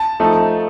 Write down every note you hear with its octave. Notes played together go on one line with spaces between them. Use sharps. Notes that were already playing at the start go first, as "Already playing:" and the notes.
Already playing: A5
F3 A3 D#4